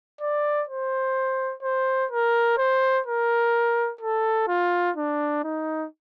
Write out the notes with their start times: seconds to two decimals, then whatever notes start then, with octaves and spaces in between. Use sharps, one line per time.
0.21 D5
0.68 C5
1.63 C5
2.11 A#4
2.58 C5
3.06 A#4
4.01 A4
4.48 F4
4.97 D4
5.44 D#4